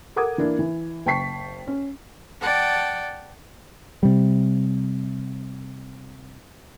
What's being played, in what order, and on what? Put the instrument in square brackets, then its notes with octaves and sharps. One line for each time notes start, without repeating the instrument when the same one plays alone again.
[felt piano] A4 A#4 F#5 D6 D#6 G#6
E3 A#3 D4 E4
E3
F#1 G5 A5 C#6 B6 C7
C#4
[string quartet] D5 F#5 G5 A5
[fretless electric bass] C3 G3